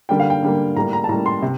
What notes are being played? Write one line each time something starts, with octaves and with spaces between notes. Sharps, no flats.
D3 G3 A#3 G5
F5
G5
D3 G3 A#3
A2 G3 A#3 A#5
A#5
A5
A2 G3 A#3 A#5
C6
C3